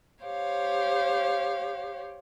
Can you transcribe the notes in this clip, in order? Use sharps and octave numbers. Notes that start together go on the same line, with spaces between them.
G4 C5 C#5 F5